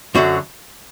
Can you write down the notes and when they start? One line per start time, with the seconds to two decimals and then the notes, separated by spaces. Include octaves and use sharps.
0.15 F#2 D3 F#3 F#4